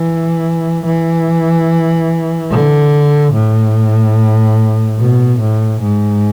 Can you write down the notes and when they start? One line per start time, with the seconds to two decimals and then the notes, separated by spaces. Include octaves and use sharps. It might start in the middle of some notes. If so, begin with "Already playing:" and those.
Already playing: E3
0.85 E3
2.51 D3
3.33 A2
4.98 B2
5.39 A2
5.81 G#2